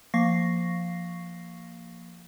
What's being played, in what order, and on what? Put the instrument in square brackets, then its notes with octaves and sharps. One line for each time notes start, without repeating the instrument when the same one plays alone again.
[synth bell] F3 A#3 F5 C#6 A#6 C7